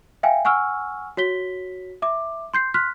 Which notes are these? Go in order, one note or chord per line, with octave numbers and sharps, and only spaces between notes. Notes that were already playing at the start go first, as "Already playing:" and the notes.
E5 F5 G5 G#5
F#5 G#5 C#6 E6 F6
F#4 C#5 B6 G7
E5 D6
C6 G6 C7
C6 F6 F#6 B6